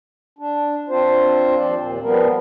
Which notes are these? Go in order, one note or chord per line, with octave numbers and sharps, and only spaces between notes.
D4
C4 D4 F4 C5
D#2 F3 C4 D5
D#2 A#2
F3 G3 B3 A#4